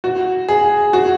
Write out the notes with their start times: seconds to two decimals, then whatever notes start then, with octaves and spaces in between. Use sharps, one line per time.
0.04 F#4
0.48 G#4
0.93 F#4